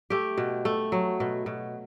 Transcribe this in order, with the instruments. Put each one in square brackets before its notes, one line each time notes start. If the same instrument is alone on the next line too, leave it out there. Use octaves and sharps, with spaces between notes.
[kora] A3 G4
B2
A3
F#3
B2
B2